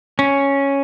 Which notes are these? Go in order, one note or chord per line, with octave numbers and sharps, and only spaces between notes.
C#4